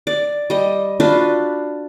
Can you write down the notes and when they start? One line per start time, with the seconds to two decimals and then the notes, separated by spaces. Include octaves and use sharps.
0.07 D5
0.50 G3 D#5
1.00 D4 F4 F#4 B4